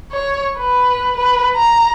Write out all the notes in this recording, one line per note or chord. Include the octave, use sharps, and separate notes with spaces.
C#5
B4
B4
A#5